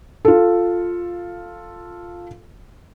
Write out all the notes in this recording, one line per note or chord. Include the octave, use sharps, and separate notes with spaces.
F4 A4